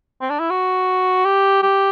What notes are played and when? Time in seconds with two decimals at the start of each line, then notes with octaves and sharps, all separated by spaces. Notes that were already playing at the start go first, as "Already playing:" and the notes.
0.21 C4
0.30 D4
0.40 E4
0.50 F#4
1.25 G4
1.62 G4